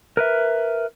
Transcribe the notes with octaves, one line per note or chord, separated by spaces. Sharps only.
A#4 B4 E5